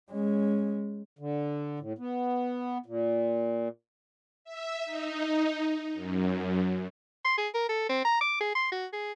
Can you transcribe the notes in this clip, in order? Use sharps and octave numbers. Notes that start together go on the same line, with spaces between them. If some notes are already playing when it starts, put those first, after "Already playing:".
G#3 C#4
D3
A2
B3
A#2
E5
D#4
F#2
C6
G#4
A#4
A4
C4
A#5
D6
G#4
C6
F#4
G#4